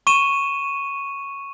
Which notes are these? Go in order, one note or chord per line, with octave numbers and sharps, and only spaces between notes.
C#6 D#7 E7